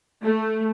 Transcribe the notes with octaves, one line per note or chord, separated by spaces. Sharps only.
A3